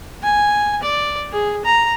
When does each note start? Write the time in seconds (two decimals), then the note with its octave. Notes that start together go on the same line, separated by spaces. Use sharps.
0.23 G#5
0.83 D5
1.32 G#4
1.65 A#5